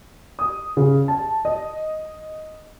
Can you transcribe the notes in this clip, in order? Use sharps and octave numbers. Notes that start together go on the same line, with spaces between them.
D#6
C#3
A5
D#5